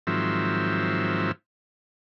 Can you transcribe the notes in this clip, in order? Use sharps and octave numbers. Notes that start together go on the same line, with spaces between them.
G#2 D#3 F3 F#3 C4 E5